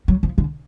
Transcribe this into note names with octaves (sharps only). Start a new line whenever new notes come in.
F#3
F3
D3